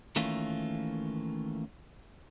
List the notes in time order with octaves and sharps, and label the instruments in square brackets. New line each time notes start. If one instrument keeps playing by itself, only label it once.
[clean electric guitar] D#3 E3 A3 A#3 C#4 F4